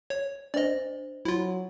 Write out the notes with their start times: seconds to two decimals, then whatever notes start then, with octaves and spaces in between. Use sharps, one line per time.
0.10 C#5
0.54 D4 C5 D5 D#5
1.25 F#3 E4 F4